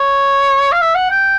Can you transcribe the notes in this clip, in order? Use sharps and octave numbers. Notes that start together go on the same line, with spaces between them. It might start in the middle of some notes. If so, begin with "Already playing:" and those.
Already playing: C#5
F5
E5
F#5
G5